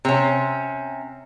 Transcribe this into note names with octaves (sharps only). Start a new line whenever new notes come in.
C3 C#4